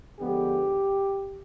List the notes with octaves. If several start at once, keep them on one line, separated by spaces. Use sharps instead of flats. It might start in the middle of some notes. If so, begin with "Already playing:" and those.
D3 F3 G#3 B3 G4